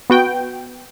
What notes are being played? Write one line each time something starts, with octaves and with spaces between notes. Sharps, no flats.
B3 F#4 G5